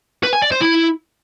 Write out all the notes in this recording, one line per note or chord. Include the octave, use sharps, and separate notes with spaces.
B4
G#5
D5
C5
E4